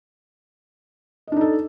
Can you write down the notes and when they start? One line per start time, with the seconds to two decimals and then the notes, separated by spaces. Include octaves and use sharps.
1.27 D#5
1.32 D4
1.36 D#4
1.41 A4